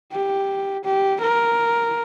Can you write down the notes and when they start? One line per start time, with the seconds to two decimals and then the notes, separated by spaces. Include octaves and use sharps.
0.12 G4
0.84 G4
1.21 A#4